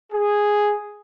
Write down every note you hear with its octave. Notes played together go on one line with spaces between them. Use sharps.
G#4